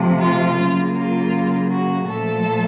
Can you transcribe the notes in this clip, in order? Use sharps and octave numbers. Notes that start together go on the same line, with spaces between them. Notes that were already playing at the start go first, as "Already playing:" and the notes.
Already playing: C3 F3 A3
F4
C#3 F#3 A#3
F4
F#4
A#2 F3 A3 A4